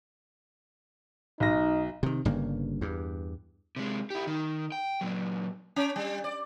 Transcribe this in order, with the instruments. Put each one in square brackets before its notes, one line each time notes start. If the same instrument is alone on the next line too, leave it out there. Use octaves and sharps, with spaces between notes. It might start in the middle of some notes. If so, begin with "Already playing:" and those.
[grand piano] B1 A#6 [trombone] D#4
[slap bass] C3 D#3
G1 G2 C#3 A#3
E2 G2
[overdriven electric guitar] C3 G#3
E4 G4
D#3
G5
A#2 F#3
[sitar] C#4
G3
D5